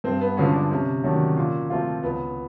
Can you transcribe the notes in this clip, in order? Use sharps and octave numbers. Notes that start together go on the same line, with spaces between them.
G2 C4
B3
D3 F3 G#3 B3 C#4
D4
C3 C#4
D#3 F#3 A3 D4
A#2
F3 A3 C4 F4
C#2 B3